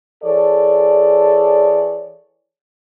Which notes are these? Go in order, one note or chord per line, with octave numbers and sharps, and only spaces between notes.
E3 G#4 A4 C#5 D5